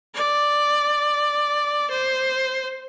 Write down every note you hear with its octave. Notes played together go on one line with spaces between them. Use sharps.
D5
C5